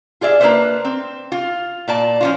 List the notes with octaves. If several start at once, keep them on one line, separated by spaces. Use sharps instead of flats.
F4 G#4 D5 E5
A#3 D4 F4 B4 C5 E5
C4
F4
A#2 D5 A5
F3 C#4 F4